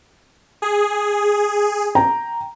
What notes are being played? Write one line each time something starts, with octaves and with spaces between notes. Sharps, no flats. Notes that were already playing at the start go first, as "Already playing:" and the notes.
G#4
G5 A#5